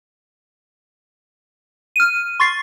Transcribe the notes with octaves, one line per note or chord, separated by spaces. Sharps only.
F6 D#7
C6 C#6 A6 C7